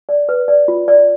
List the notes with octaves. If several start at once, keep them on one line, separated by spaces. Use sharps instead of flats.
D5
B4
D5
F4
D5